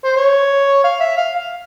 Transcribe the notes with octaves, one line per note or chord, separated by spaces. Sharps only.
C5
C#5
F5
E5
F5
F5